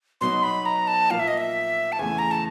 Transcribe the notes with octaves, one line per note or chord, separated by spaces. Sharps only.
B2 F#3 B3 D#4 C6
B5
A#5
A5
A#2 F3 A#3 F5
E5
D#5
E5
A5
E2 C#3 E3 A3 G#5
A#5
A5